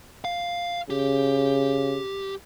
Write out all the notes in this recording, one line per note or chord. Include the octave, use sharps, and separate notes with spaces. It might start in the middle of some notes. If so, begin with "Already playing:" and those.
F5
C#3 G4